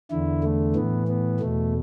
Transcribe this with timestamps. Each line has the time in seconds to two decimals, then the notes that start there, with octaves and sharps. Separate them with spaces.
0.11 E2 D3 E4
0.43 A3
0.75 A2 E3 B3
1.08 B3
1.40 E2 B2 A3